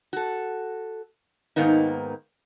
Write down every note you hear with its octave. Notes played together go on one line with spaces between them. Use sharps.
F#4 A4
G#2 D#3 A#3 B3 D#4